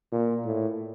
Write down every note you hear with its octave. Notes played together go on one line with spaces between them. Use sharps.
A#2
A2